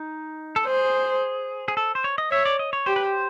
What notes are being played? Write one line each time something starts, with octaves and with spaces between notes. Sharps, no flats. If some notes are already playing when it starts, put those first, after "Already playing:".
Already playing: D#4
A4
G#4 C5
G#4
A4
C5
C#5
D#5
C#5 E5
D5
D#5
C#5
G4 C5
B4
C5